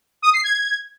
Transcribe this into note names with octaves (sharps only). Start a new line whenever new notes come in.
D#6
C7
G#6